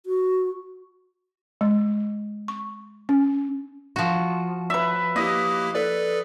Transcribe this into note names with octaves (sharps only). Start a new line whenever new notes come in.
F#4
G#3
C#6
C#4
F3 F#4
B4 E5
A#3 E4 G4 D#5
A4 B4 D5